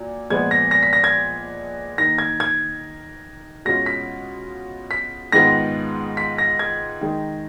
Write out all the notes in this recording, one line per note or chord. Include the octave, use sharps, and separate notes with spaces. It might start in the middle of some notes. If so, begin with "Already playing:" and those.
Already playing: A#2 F#3
A#2 F3 G#3 B3 G#6
A#6
A#6
B6
A#6
G#6
D#3 A#3 D#4 A#6
G#6
G#6
B2 G#3 C#4 F4 A#6
B6
B6
G#2 D#3 G#3 B3 F4 A#6
B6
A#6
G#6
D#3 G#3 D#4